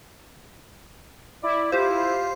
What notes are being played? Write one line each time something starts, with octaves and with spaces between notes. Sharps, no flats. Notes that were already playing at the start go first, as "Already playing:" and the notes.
E4 D5
F4 G4 C5